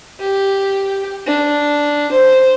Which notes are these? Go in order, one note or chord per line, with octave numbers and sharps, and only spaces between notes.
G4
D4
C5